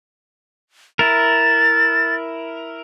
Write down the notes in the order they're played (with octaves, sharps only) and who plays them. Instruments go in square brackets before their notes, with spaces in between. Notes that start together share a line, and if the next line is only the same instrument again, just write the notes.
[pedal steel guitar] E4 A#4 [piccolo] A6